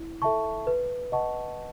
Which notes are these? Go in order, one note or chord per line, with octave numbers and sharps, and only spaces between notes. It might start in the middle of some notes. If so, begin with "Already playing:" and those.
Already playing: E4
A4 E5 A5 C#6
B4
D#5 F#5 A5 C#6